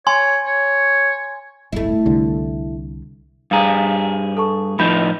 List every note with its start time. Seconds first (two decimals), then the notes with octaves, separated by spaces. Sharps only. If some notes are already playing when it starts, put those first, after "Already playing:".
0.07 C#5 G#5 C6
0.46 C#5
1.73 D1 G1 A3 E4
2.06 C2 D3
3.51 G2 G#4 F5 A#5
4.37 A4 A5 C#6
4.79 A2 F3 D#4 B5 G6